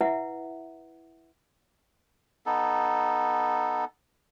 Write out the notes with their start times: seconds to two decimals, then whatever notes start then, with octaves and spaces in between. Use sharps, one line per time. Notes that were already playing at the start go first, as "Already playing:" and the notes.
0.01 E4 B4 E5 F#5
2.46 B3 D#4 A4